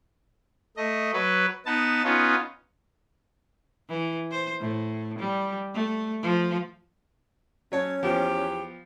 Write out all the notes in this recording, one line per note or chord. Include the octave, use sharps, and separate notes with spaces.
A3 D#5
F#3 B4
B3 D#4 A5
B3 C#4 D#4 F4
E3
C5
A2
G3
A3
F3
F#3 C#4 C#5 A5
E2 F3 B3 G4